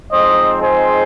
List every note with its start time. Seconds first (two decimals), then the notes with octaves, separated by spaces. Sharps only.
0.12 F3 G#3 C4 D#4 C5 D#5
0.62 G#4 C5